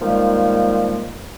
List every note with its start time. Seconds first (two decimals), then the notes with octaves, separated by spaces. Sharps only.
0.01 D#3 F3 G3 G#3 A#3